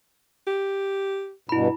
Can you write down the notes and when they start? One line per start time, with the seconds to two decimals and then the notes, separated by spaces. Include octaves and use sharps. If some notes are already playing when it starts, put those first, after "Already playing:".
0.47 G4
1.49 G2 B2 E4 B5